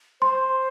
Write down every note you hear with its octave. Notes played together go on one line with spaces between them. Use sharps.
C5 C6